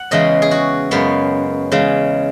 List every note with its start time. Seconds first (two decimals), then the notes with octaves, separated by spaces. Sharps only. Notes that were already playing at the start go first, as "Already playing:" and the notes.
Already playing: F#5
0.11 E2 C#3 E3 G#3 D#5
0.42 G#4
0.51 F#4
0.91 F#2 C#3 G#3 B3
1.71 E2 C#3 G#3